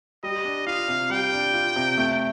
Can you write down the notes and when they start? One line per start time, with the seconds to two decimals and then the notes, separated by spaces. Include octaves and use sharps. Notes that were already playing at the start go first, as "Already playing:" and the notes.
0.23 G3 D#5
0.45 D4
0.66 F4 F5
0.88 C3
1.10 G3 G5
1.32 D4
1.54 F4
1.76 C3
1.98 A3